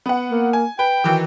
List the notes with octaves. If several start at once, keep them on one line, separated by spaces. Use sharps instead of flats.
B3 F#5
A#3
G#5
B4 G5
D#3 E3 F#3